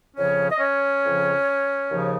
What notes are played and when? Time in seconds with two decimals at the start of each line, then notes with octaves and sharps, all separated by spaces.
0.17 F2 C#3 F3 C#4 C#5
0.51 D#5
0.60 C#4 C#5
1.04 F2 C#3 F3
1.89 D#2 C#3 F3